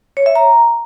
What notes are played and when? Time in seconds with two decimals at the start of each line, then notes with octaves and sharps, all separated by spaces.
0.17 C#5
0.26 E5
0.35 A#5